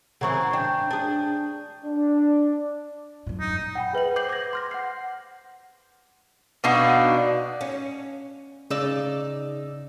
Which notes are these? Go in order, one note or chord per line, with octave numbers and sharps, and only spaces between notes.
C#3 E3 C4 F#5 A#5 C#6
D4 G5 G6
D4 G#4
D4
F#2 A#2
D#4
F#5 G5 B5
G#4 B4 E5 F#7
C5 D6 G6 C7 F#7
D6 G6 G#6 A#6
C6 F6 A#6
F#5 G6 C7
B2 D4 D#4 F5
C#4
C#3 D#4 D5 E6